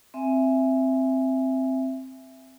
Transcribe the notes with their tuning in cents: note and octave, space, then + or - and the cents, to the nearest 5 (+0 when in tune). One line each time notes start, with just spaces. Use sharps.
C4 +0 E5 +10 G#5 +0